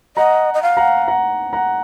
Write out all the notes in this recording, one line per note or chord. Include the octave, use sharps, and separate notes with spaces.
D#5 F#5 A#5
D#5
F5
F#5 A#5
F#5 A#5
F#5 A#5